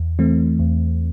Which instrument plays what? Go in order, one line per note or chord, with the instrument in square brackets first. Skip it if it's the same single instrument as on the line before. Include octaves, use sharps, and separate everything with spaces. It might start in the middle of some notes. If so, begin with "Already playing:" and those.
Already playing: [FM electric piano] E2
E3 A3 C4
E2